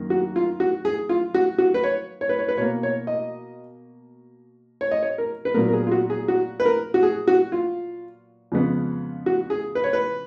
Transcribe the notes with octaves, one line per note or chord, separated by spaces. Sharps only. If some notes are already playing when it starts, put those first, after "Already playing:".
Already playing: F#2 D#3 A#3
F#4
F4
F#4
G#4
F4
F#4
F#4
B4
C#5
C#5
B4
C#5
B4
B2 A#3 C#5
C#5
D#5
C#5
D#5
C#5
A#4
B4
A#2 F#3 B3 A#4
A#4
G#4
F4
F#4
G#4
F#4
B4
A#4
F#4
G#4
F#4
F4
F2 C#3 G#3 B3
F#4
G#4
B4
C#5
B4